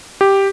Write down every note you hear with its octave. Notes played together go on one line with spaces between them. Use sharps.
G4